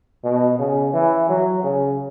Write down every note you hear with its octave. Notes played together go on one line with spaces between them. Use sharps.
B2
C#3
E3
F#3
C#3